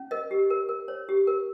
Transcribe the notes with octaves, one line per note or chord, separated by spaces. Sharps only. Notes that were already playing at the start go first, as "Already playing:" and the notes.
Already playing: C#4
A#4 D#5
G4
A#4
A#4
C#5
G4
A#4